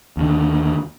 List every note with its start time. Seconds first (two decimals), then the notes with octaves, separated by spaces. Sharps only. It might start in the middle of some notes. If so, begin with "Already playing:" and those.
0.17 D#2 D3